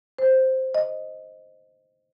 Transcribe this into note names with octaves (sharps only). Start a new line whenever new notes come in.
C5
D#5